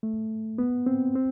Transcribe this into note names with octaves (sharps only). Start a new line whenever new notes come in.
A3
B3
C4
C4